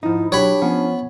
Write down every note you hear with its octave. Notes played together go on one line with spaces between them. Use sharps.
G#2 F3 D#4 E4
F#3 D4 G4 C#5 B5
F3 B3 C#4